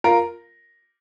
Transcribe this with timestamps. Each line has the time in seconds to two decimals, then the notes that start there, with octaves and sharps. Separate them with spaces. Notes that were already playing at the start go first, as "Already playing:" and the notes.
0.04 F4 A#4